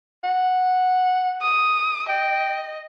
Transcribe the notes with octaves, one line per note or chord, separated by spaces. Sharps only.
F#5
D#6
D#5 G5